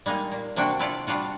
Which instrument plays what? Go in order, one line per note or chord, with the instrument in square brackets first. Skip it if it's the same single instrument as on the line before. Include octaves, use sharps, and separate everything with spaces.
[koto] G3 G#3 A#3 D#4
A#2 A#3
C3 A#3 C4 D4 F#4 G5
C4 E4 F4 A4 D5
G3 D4 F4 F#4